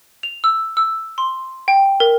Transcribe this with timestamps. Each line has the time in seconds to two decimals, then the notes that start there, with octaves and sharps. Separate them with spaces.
0.23 F7
0.44 E6
0.77 E6
1.18 C6
1.68 G5
2.00 A#4